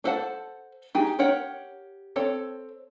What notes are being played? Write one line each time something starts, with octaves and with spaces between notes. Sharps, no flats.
D4 A4 C5 F#5 A5
D#4 G4 G#4
G4 A#4 C#5 F#5 G5
C4 A4 C#5